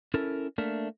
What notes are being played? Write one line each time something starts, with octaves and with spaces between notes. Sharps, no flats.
C#4 E4 A4 A#4
A3 A#3 D4 A#4 E5